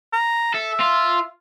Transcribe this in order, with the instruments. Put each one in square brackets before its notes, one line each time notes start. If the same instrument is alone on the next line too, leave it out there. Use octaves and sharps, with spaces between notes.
[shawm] A#5
[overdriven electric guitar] A4 [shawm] E5
[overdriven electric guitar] F4